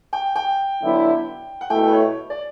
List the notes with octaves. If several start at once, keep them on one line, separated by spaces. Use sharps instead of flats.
G5
G5
D3 F#3 B3 E4
F#5
B2 A3 E4 G5
B4
C#5
D5